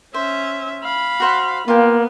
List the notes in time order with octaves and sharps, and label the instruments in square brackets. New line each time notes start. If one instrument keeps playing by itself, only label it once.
[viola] C#4 E5 [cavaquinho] C5
[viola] F5 B5
[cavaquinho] F#4 C5 F#5
[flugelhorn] A#3 [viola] B3 [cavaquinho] F4 A#4 G5